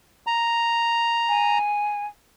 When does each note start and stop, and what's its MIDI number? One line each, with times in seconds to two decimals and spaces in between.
0.27 1.58 82
1.29 2.06 80